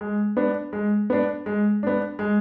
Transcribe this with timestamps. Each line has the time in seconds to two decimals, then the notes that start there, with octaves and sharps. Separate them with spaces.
0.01 G#3
0.37 B3 D4
0.73 G#3
1.10 B3 D4
1.46 G#3
1.83 B3 D4
2.19 G#3